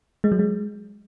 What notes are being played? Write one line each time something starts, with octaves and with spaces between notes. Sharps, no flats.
G#3
F#3
G#3